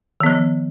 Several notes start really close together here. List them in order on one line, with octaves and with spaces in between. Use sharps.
D#3 B3 F3